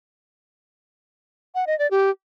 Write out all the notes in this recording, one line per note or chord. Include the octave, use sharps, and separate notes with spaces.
F#5
D#5
D5
G4